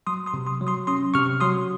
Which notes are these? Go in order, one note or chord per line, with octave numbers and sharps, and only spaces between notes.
F#3 C6 D#6
C6 D#6
C3
C6 D#6
F#3
C6 D#6
C#4 C6 D#6
C3 C#6 F6
F#3 C6 D#6